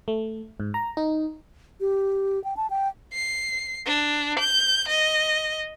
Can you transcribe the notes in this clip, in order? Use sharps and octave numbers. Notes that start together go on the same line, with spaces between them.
A3
G#2
A#5
D#4
G4
G5
A5
G5
C7
D4
G6
D#5